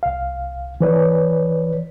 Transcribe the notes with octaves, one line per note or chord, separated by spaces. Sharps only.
C2 F5
E3 B4 C#5 D5